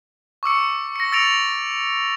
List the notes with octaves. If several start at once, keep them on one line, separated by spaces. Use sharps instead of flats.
C#6 D6 E6 C#7
A#6 C#7
E6 A6 A#6 C#7 D7 F7